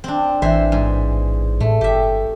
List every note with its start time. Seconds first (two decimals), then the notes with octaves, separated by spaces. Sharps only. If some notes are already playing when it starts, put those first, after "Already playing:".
0.04 C4 D4
0.42 A1 E3 C5 E5
0.72 G#2
1.60 A2 A3
1.81 G1 G4 E5